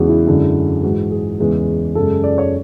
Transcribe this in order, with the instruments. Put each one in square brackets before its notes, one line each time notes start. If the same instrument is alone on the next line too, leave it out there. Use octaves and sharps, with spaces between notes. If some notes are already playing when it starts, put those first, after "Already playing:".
Already playing: [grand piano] E2 C#3 G#3 F#4 G#4
E4
F#2 D3 G#3
G#2 E3 G#3 F#4
G#4
E2 C#3 E3 G#3
F#2 C#3 G#3 A4
D5
C#5